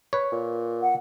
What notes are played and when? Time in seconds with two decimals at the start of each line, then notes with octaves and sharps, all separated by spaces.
0.13 B4 C#5
0.33 A#2
0.82 F#5